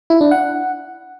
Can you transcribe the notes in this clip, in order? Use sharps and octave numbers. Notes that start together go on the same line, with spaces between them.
E4
D4
F#5